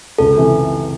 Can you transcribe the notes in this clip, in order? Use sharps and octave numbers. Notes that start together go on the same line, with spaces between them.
C#2 A4
C3 E3